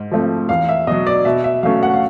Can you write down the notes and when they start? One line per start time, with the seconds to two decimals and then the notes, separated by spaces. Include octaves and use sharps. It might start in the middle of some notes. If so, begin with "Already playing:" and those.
Already playing: G#2
0.11 F3 A3 C4
0.49 E2 F5
0.69 E5
0.87 B2 F#3 D#5
1.07 D5
1.25 B2 E5
1.44 E5
1.63 F#3 A3 C#4 F5
1.83 F#5
1.93 F5